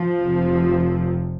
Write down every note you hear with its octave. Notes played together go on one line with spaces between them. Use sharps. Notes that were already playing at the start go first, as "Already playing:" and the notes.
Already playing: F3
F1 F2 C3